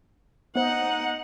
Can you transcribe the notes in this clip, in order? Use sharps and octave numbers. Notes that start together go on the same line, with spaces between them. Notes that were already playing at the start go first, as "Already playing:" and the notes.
B3 D#4 C5 F#5